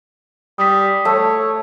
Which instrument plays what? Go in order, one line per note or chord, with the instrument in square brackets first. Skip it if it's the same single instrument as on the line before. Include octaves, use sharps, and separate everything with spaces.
[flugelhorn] G3 [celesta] D#6 B6
[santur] A3 [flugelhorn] C#5